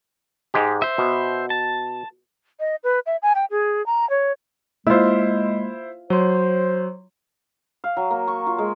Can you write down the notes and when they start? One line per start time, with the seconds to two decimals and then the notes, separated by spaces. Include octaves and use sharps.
0.54 G#2 G#3 G4
0.82 C5 E5
0.98 B2
1.50 A5
2.60 D#5
2.84 B4
3.06 E5
3.22 G#5
3.35 G5
3.51 G#4
3.86 A#5
4.10 C#5
4.87 G#3 A#3 E4 F4 C5 E5
6.10 F#3 C5 C#5 C6
7.84 F5
7.97 F#3
8.10 A#3
8.27 C#6
8.47 F4
8.58 G#3